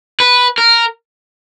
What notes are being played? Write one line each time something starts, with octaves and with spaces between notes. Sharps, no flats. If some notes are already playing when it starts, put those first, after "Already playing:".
B4
A#4